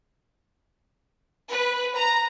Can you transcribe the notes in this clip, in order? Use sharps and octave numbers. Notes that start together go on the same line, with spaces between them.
B4
A#5